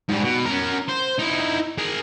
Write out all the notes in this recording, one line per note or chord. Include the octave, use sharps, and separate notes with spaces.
G#2 G3
B2
C#4 A#4
C5
D#4 E4
G#4 A#4